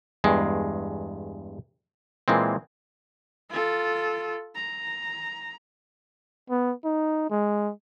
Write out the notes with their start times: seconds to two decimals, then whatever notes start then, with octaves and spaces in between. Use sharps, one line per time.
0.24 E2 G2 G#3
2.28 A#2 E3 G#3 C4
3.50 F4 A4
4.55 A#5
6.50 B3
6.84 D#4
7.30 G#3